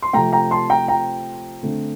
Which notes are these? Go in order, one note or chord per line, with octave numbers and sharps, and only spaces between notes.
C6
C3 F3 A3 C4 G5 A#5
G5 A#5
A5 C6
G5 A#5
G5 A#5
D3 A3 C4